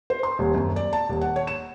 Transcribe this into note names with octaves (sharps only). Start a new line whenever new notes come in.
C5
C6
D#1
F#2
D5
A5
D#1
F#5
C#5
E7